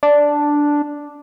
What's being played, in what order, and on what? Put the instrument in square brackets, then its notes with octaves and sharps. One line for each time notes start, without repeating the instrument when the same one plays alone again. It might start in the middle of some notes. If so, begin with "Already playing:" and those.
[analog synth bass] D4